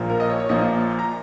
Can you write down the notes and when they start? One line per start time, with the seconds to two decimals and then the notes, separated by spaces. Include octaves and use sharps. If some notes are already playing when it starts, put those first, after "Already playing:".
Already playing: A#1 A#2 F3 A#3
0.10 A#4
0.20 D#5
0.30 C#5
0.40 C#5
0.49 A#1 A#2 F3 A#3 D#5
0.99 A#5